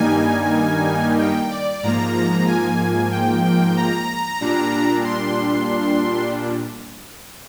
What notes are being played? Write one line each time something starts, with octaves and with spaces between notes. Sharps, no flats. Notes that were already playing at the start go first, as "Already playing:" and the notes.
Already playing: G2 D#3 G3 A#3 D#4 G#5
G5
D5
G#2 F3 A#3 A#5
A#5
G#5
G5
G5
A#5
A#2 G3 D4
C6